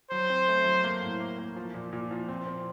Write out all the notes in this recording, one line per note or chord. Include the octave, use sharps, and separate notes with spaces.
F#3 C5
C4
A3
F#3
A#3
A2
A#3
A#3
F3
A#2
A#2
F3
C4
C4